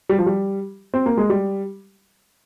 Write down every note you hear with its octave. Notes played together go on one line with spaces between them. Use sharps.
G3
F3
G3
C4
A#3
G#3
G3